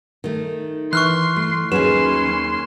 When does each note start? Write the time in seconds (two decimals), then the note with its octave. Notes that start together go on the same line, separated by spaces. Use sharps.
0.24 D#3 A3
0.93 E3 C6 C#6 F6 F#6
1.36 A3
1.72 D#2 F#3 C#4 G#4 B4 C6 E7